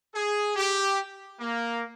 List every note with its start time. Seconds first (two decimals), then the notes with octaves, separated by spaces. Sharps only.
0.15 G#4
0.56 G4
1.40 A#3